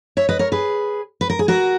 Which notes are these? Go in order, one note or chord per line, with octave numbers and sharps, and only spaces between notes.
C#5 E5
B4 D#5
A#4 C#5
G#4 B4
B4
A#4
G#4
F#4 A#4